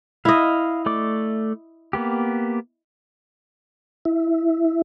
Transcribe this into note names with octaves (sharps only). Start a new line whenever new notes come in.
E4 D#5 F5
A3 D5 D6
A#3 B3 G4
E4